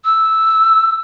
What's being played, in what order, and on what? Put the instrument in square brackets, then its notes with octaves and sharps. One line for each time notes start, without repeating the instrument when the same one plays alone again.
[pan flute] E6